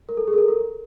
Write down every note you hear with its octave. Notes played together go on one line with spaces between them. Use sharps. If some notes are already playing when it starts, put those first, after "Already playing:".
A#4
A4
G#4
A#4
A4
A#4